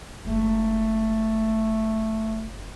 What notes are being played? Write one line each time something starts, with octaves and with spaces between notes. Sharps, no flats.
F#1 G#3 A3